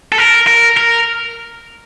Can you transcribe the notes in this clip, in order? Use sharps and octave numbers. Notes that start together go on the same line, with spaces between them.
A4
A#4
A#4
A#4